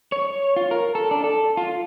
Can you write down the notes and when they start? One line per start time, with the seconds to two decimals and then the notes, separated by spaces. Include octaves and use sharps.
0.12 C#5
0.56 F4
0.71 A#4
0.95 A4
1.11 D4
1.24 A4
1.57 F4